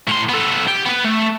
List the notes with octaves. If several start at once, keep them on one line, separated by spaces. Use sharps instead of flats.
A2 C6
B3 A4
G4
B3 B4
A3